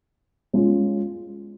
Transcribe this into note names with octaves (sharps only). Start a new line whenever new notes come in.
G#3 C#4 F4